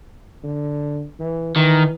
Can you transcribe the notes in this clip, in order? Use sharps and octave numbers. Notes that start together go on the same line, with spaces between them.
D3
E3
D#3 E3